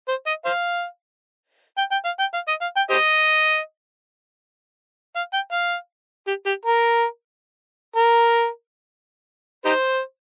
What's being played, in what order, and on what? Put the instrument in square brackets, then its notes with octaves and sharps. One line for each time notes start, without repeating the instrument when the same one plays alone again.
[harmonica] C5
D#5
C5 F5
G5
G5
F5
G5
F5
D#5
F5
G5
G4 C5 D#5
F5
G5
F5
G4
G4
A#4
A#4
D#4 G4 C5